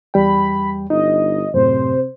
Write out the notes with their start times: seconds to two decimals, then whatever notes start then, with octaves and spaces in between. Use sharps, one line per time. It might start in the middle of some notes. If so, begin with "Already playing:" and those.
0.14 E2 G3 G5 B5
0.90 G1 D#4 D#5
1.54 F#2 A2 C3 C5